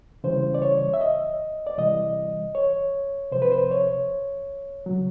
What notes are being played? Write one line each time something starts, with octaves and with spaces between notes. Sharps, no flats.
C#3 E3 G3 C5
D5
C#5
E5
D#5
D5
C3 E3 G3 D#5
C#5
C3 F3 C5
B4
C5
C#5
C#3 F#3